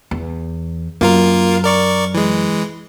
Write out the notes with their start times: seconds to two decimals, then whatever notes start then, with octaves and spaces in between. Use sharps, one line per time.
0.11 E2
1.01 F#2 A#3 F4 A#4
1.64 A#4 D5 C#6
2.14 E3 G#3